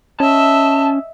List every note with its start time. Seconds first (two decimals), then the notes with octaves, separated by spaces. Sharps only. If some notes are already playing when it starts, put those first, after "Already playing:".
0.20 C#4 D#5 E5 A5